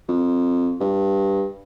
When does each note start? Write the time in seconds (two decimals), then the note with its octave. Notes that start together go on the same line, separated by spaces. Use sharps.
0.09 F2
0.81 G2